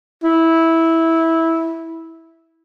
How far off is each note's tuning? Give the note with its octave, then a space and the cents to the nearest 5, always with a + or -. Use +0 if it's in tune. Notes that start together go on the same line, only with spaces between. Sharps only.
E4 -10